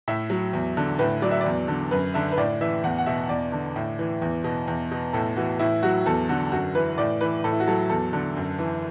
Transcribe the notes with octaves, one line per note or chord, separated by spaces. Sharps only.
A2 E5
F#3
E2
D3
A2 B4
F#3 D5
E5
D5
E2
D3
F#2 B4
D3 E5
B4
A2 D5
E3 E5
E2 F#5
F#5
B2 E5
E2 D5
D3
A2
E3
E2
B2
E2
B2
A2 A4
E3 F#4
A2 E4
F#3 F#4
E2 A4
D3 F#4
F#2 F#4
E3 B4
A2 D5
E3 B4
A2 A4
E4
F#4
F#3 A4
E2 A4
D3
F#2
E3